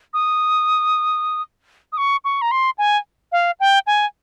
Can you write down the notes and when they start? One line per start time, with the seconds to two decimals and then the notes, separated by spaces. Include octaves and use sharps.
0.14 D#6
1.92 D#6
1.98 C#6
2.24 C#6
2.42 A#5
2.51 C6
2.78 G#5
3.32 F5
3.60 G5
3.87 G#5